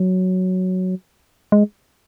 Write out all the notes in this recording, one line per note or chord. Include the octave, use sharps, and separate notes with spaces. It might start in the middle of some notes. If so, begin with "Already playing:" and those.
Already playing: F#3
G#3